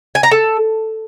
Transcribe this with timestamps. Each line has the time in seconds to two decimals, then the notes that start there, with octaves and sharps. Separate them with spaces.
0.15 G#5
0.23 A#5
0.31 A4